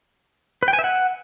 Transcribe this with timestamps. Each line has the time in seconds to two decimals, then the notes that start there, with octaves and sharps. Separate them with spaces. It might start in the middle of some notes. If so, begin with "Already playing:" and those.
0.63 B4
0.68 G5
0.73 G#5
0.79 E5
0.84 F#5